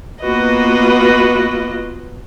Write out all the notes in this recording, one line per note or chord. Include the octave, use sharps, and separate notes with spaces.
A#3 B3 F4 F#4 B4 D#5